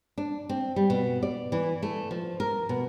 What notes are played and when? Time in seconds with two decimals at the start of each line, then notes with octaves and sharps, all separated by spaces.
0.18 D4
0.49 C4
0.76 G3
0.90 B2
1.23 D5
1.52 E3
1.83 A3
2.11 F3
2.40 A#4
2.69 B2